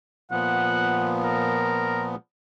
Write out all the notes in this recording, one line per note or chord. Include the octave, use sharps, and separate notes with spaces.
A#2 F3 B3 F#5
A#4